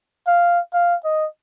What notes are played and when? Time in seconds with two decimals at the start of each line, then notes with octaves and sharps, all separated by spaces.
0.27 F5
0.73 F5
1.04 D#5